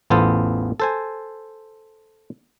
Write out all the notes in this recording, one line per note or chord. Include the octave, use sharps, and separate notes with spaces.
A1 E2 B3 F4 A4 C5
A4 C5 G#5